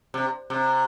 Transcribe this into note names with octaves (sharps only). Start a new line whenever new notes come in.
C3
C3